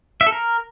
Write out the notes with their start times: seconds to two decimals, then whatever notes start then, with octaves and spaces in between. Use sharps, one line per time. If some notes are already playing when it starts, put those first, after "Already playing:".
0.21 E5
0.27 A4
0.32 A#4